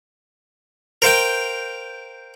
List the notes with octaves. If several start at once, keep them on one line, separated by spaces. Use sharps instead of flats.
A#4 C5 F5 G5